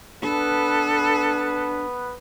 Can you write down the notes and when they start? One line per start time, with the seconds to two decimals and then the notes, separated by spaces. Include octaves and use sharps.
0.22 B3 D4 A4 B4